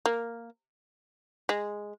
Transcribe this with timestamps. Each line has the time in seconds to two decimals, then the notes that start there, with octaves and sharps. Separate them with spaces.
0.06 A#3
1.49 G#3